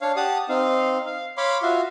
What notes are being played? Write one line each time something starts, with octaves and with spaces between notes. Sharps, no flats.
D4 C#5 F5
G4 F#5 A5 D#6
C4 D#4 F5
F5
C#5 F5 B5 C6 D6
F4 F#4 E5 F5